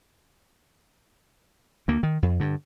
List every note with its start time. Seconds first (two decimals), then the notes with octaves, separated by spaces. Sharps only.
1.88 D2 A#3
2.03 D#3
2.22 F2
2.40 G2 D3